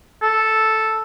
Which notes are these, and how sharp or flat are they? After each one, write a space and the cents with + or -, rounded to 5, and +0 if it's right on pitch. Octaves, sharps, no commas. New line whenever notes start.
A4 +0